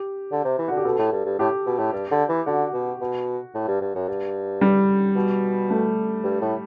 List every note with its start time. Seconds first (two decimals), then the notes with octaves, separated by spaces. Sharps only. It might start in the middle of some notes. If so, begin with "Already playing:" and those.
Already playing: G4
0.31 D3
0.44 C3
0.58 E3
0.68 D3 F#4
0.77 G4
0.85 B2 A4
0.98 A2
1.12 G2
1.25 G2
1.39 A2 G4
1.66 B2
1.79 A2
1.92 G2
2.11 D3
2.29 E3
2.46 D3 F#4
2.73 B2
3.01 B2
3.54 A2
3.67 G2
3.81 G2
3.95 F#2
4.08 G2
4.61 G3
5.15 B2
5.70 A3
6.24 G2
6.41 A2